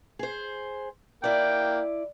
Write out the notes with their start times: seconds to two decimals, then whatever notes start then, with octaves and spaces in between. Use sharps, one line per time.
0.19 G#4 C5
1.24 A#3 E4 D5 G5